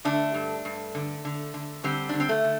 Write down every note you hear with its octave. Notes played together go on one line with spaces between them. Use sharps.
D3 A3 D4
G2
G2
D3
D3
D3
D3 G3 C4
D3 D4
C4
A3
D3